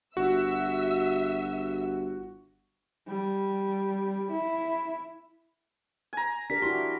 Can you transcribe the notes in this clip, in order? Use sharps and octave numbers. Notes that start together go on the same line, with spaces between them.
G1 F#4 E5 E6
G3
E4
G#5 A#5
D4 G4 A#4 B6
E4 F#4 G4 C6